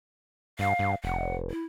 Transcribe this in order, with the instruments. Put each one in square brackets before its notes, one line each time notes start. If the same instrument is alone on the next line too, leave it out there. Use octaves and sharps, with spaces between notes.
[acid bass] G2 [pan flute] F5
[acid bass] G2
[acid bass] F1 [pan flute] F#5
[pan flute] E4